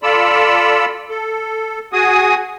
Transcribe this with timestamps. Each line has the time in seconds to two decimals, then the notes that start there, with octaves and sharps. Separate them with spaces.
0.03 F4 A4 D5 B5 E6
1.10 A4
1.93 F#4 G#4 G#5 D#6